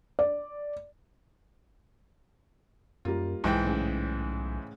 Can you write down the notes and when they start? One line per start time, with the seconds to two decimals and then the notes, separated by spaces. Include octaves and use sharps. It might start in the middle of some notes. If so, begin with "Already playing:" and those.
0.19 D5
3.05 F#2 G3 A#3 F4
3.44 B1 G#2 E3 G5
3.64 A2 C#3